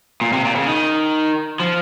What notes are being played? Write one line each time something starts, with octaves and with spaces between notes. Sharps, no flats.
A#2
C3
A#2
C#3
D#3
F3